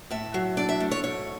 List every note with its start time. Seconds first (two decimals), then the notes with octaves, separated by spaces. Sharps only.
0.11 A2 E5
0.34 F#3
0.57 D4 D5
0.69 E5
0.80 A3
0.91 C#5
1.03 G#2 C#5